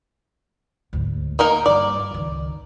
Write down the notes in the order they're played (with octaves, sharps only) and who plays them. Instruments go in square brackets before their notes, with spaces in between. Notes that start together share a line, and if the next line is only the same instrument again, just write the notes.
[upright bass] D2 G#2
[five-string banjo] A#3 D#4 A#4
[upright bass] G2 [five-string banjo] D5
[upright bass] C#2 D#3